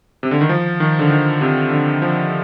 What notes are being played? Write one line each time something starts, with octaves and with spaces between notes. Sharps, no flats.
C3
D3
D#3
F3
D#3
D3
D#3
C3
D3
F3